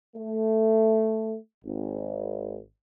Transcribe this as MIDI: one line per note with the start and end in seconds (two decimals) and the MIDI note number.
0.16 1.37 57
1.65 2.59 32